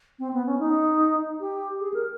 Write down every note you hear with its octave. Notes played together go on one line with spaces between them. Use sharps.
C4
B3
C#4
D#4
G4
G#4
A#4